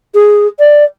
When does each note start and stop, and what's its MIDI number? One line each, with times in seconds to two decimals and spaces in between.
0.14 0.47 68
0.59 0.83 74